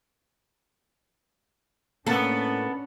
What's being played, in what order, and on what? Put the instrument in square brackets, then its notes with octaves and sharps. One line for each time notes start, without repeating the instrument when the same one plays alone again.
[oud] A2 A#3 [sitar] B3 A4 [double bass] C#4 D4